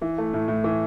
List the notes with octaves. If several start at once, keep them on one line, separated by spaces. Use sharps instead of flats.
E3
A3
A2
A2
E3